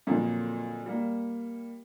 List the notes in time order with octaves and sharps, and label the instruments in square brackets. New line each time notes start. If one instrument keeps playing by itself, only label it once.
[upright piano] F2 A#2 D3 F#3
G3 A#3